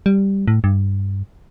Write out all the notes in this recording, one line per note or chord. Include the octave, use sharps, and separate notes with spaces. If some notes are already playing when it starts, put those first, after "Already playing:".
G3
A2
G2